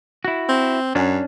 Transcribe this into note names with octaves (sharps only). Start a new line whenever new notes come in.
E4 F#4
C4
F#2 C#4 D4